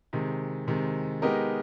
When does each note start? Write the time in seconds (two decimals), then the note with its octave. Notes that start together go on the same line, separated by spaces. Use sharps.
0.13 C3 D#3 G#3
0.68 C3 D#3 G#3
1.22 G#3 B3 D#4 G4 A#4